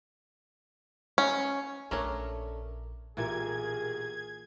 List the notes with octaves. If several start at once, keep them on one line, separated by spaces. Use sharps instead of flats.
C#4
A#1 A3 C#4 D4 A4 A#4 C#5
B1 A#2 E3 G4 G#4 A#4 G#6